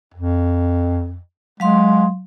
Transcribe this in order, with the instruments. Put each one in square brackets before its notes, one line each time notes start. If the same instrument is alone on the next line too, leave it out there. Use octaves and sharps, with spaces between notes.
[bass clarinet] F2
[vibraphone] F#3 F5 C6 [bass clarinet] G#3